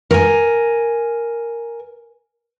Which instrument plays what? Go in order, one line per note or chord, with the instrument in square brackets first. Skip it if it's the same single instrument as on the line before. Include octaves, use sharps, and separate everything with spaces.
[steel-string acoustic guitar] A#4 G#5